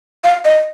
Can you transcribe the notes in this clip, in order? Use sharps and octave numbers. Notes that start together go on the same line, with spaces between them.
F5
D#5